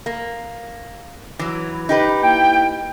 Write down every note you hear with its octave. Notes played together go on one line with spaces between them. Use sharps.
A#3
E3 F#3
D#4 G4 B4
A#3 E4 G5